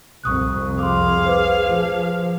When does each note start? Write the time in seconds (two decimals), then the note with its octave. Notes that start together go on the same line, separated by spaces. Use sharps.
0.24 C2 F2 C#6 D#6 F#6
0.79 G#4 F5 C6 D6
1.24 B4 C5 D6
1.66 F3